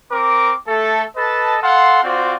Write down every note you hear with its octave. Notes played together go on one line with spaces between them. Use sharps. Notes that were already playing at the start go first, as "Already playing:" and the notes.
C4 A#4 D6
A3 A4
A4 B4 D#5 A5
A4 F5 F#5 C6
C4 F4 F#4 C5 D5